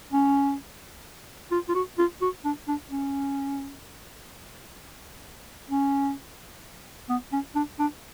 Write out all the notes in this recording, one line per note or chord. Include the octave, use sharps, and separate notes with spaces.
C#4
F4
F4
F#4
F4
F#4
D4
D4
C#4
C#4
B3
C#4
D4
D4